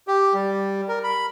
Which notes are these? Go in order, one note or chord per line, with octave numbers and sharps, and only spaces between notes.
G4
G3
A#4
B5